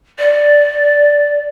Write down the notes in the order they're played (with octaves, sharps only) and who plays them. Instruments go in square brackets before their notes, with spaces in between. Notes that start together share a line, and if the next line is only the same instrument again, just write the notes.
[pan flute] D5